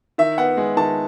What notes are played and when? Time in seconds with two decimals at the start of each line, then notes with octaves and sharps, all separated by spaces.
0.18 D#3 E5
0.38 B3 F#5
0.57 G#3
0.77 D#3 A5